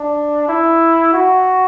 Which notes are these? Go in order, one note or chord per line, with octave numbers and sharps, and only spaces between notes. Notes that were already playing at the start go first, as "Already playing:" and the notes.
Already playing: D4
E4
F#4